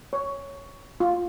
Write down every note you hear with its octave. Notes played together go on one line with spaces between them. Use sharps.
C#5
F4